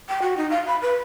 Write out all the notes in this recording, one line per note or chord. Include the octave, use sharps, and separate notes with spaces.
G5
F#4
D#4
F5
B5
B4